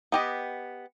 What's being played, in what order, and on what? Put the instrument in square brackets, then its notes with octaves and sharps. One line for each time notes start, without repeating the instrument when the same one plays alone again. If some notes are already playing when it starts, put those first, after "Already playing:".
[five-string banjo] B3 G4 D#5